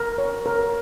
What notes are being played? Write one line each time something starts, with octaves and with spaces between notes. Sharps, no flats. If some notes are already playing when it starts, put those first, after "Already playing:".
Already playing: A#4
C#5
A#4